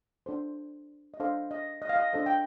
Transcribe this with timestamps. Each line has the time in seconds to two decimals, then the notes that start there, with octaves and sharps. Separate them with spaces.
0.26 D4 A4 C5
1.14 D#5
1.20 D4 A4 C5 F5
1.51 D#5
1.82 D#5
1.89 F5
1.96 D#5
2.13 D4 A4 C5 D#5
2.26 G5